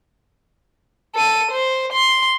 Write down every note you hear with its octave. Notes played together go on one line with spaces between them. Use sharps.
A4 D#7
C5
C6